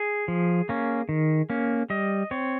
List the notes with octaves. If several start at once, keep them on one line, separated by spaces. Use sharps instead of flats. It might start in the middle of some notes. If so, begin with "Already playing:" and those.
Already playing: G#4
F3
A#3 C#4
D#3
A#3 C#4
G3 D#5
C4 C#5